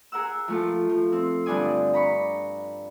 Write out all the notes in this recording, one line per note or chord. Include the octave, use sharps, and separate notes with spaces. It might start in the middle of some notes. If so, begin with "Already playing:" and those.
G#4 A#4 F#5 E6
F3 A3 F4
F3
C4
G2 D3 D4 D5 G#5 D#6
A#5 B5 C#6